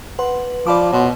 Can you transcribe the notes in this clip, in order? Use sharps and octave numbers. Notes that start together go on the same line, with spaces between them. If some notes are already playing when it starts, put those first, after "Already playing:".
B4 F#5 C6
F3 D5 B5 D6
B2 C#5 C6